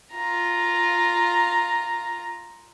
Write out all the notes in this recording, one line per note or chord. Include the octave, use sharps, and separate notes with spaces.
F4 A#5